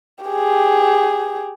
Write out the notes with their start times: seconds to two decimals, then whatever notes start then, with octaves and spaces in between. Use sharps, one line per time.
0.25 G4 G#4